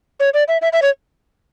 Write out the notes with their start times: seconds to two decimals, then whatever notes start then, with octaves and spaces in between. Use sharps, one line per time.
0.20 C#5
0.34 D5
0.48 E5
0.62 E5
0.73 E5
0.82 C#5